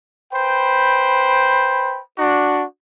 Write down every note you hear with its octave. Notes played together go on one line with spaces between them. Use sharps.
B4 C5 G5 B5
D4 F#4